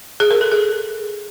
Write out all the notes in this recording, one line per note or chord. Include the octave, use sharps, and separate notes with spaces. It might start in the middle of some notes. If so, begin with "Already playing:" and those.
G#4
A#4
A4
G#4